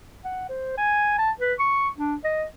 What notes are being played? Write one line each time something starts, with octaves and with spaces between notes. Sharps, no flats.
F#5
C5
G#5
A5
B4
C#6
D4
D#5